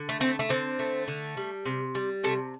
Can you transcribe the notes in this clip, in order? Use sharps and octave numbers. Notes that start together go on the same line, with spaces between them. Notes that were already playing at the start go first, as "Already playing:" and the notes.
Already playing: D3
A3
A3 C4
A3
D3 C4
A3
D3
G3
C3
G3
C3 A3